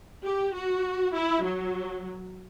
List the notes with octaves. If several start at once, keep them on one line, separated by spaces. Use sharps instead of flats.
G4
F#4
E4
F#3